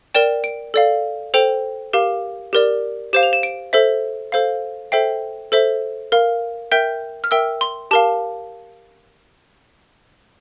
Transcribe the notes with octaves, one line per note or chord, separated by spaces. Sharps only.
A#4 D5 G5 E7
D7
A4 D5 F5
A4 C5 G5 F7
G4 A#4 F5
G4 A#4 D5
G4 C5 F5 E7
F7
E7
D7
A4 C5 E5
A4 C5 F5
A4 C5 E5 G5 C7
A4 C5 E5
A#4 F5
A#4 E5 G5 G6
F6
A#4 E5 G5 E6
C6
G4 A#4 F5 A5